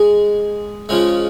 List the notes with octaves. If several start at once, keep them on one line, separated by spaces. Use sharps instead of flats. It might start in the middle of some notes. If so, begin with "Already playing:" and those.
Already playing: G#3 G#4
C#3 F3 G#3